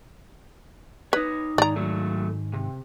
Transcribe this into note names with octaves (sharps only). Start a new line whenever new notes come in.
D#4 B4 C#5
G#2 D#3 D5 A#5
F#3 A3
C3